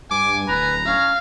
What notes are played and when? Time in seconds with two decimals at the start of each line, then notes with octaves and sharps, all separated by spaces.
0.11 G2 G#5 D6
0.49 D1 B4 A#5
0.85 C#4 F5